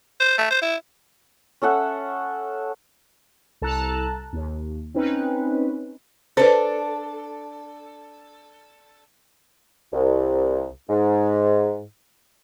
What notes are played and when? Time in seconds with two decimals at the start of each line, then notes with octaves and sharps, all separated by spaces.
0.20 C5
0.38 A3
0.51 C5
0.62 E4
1.62 C#4 A4 E5 F#5
3.62 C2 A4 A5 A#5 F#6
4.33 D#2
4.95 C4 C#4 D#4 B4
6.37 D4 A4 B4 C5
9.93 C2
10.89 G#2